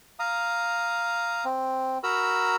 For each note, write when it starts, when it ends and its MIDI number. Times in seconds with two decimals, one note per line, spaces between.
0.19 1.45 77
0.19 1.45 82
0.19 1.45 87
1.45 1.98 60
2.04 2.56 66
2.04 2.56 70
2.04 2.56 82
2.04 2.56 83
2.04 2.56 88